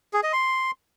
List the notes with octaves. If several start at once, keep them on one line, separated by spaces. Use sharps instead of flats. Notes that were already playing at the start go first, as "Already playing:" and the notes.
G#4
D#5
C6